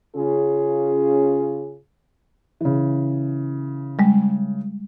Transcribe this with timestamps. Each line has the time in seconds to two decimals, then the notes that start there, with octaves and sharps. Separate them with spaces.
0.16 C#3 C#4 F4 G#4
2.61 C#3 E3
3.99 G3 G#3